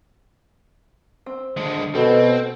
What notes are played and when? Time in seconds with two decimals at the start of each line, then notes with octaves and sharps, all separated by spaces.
1.26 C4
1.57 D3 G#3
1.95 B2 C4 A4